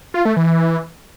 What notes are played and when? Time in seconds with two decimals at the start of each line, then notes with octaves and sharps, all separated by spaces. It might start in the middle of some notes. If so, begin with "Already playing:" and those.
0.14 F4
0.25 A3
0.37 E3